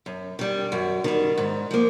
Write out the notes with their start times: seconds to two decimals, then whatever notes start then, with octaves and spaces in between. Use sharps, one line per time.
0.06 F#2
0.39 D#3 G3
0.72 F#2
1.04 D#3 G3
1.38 G#2
1.71 F3 A#3